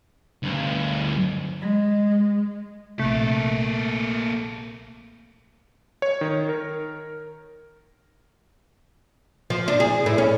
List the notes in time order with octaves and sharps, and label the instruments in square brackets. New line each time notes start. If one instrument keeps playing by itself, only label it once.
[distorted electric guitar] D2 G2
[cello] G#3
[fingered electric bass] A#1 C3 [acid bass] A3 [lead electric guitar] A#3 A4
[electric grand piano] C#5
D#3
A#4
[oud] F3
D4
G#4
A2
C#4